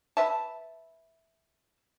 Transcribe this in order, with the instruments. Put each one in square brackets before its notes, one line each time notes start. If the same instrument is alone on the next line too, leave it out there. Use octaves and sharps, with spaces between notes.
[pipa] B4 E5 A5